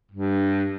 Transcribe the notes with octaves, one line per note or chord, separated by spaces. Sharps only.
G2